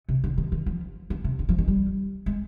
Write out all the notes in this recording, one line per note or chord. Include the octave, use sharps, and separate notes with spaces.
C3
D3
D#3
D#3
F3
D3
C3
D3
F3
D#3
G3
G#3